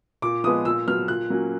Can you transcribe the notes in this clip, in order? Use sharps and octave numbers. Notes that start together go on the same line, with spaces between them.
A#2 D6
F3 G#3 B3 D#6
A#2 E6
F#3 B3 F6
A#2 F#6
F#3 A#3 C#4